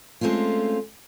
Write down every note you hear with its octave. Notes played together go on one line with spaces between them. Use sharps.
G#3 A3 C4 C#4 F4